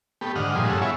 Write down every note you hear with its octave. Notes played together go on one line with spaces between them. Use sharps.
A3 B3 G4
G#2 D3 D#5 F#5 F6
A#2 F3 G3 G#4 C6 D#6
G2 C#3 G#4 A4 F#5 E6
B3 E4 F4 G#4 C#5 E5